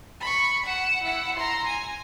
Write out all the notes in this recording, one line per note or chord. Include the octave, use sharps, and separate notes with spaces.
B5 C#6
F#5 E7
E4 F#5
A#5 C6
G#5